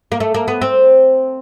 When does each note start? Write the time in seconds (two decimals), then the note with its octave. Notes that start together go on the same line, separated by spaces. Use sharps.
0.12 A#3
0.20 A3
0.34 A#3
0.48 B3
0.61 C4